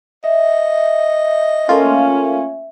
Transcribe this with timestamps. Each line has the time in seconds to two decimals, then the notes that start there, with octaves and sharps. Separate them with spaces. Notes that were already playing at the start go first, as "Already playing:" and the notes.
0.24 D#5 E5
1.69 A3 A#3 C#4 F4